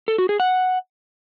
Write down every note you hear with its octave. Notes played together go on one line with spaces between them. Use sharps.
A4
F#4
G#4
F#5